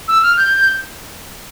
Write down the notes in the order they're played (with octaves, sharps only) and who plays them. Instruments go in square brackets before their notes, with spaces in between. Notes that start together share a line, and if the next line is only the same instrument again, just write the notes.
[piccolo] E6
F6
G6